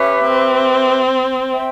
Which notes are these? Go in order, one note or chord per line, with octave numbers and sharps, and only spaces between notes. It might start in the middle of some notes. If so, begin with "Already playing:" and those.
Already playing: C#4 G4 B4 E5
C4
C5 E5 G5